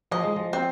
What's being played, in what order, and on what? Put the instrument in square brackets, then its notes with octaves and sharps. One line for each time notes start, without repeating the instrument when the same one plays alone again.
[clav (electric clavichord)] F3 [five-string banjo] D#5
[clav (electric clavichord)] G#3
F3
[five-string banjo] C4